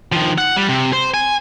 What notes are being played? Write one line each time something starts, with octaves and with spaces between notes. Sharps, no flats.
D#3 F3
F#5
G3
C3
C5
G#5